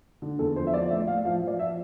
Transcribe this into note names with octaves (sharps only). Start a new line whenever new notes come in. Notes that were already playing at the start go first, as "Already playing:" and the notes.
D3
E2 A4
F3 C5
E5
F3 D5
A2 E5
A2 F5
F3 F5
F3
D5
F3 E5